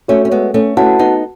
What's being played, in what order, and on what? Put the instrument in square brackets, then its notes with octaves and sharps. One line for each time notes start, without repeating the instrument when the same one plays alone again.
[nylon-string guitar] A3 C#4 [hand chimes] F#4 C#5 E5
[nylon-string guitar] C#4
G#3 B3
A3 C#4
[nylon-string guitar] C#4 E4 [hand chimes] F#4 B4 F#5 A5
[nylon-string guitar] B3 D#4